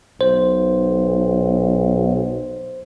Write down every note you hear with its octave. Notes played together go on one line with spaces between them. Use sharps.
B1 C5